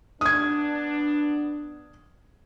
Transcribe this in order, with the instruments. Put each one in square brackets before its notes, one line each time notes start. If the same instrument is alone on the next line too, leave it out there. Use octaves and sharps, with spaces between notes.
[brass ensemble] B3 D4 [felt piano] D#6 G#6